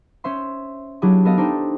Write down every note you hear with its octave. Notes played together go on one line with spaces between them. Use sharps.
C#4 C5 E5 C6
F#3 A#3 D4 E4 G4 G#4
B3 A4 D#5 F5
D4 D#4 C5 G5